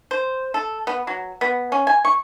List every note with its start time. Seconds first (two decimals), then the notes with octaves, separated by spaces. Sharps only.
0.11 C5
0.54 A4
0.87 B3
1.07 F#3
1.41 B3
1.72 C#4
1.87 G#5
2.05 C#6